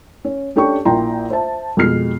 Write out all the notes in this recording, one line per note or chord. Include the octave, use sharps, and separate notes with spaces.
C#4
C#4 D4 G4 A4 D5 C#6
A#1 A#3 E4 G5 A#5 C6
C5 E5 A5
F2 B2 G#3 F6 C7